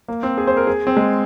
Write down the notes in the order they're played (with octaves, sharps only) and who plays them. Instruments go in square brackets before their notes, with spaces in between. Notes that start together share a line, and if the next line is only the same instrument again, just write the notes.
[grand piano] A#3
C4
G#4
C5
A#4
G#4
C4
G#3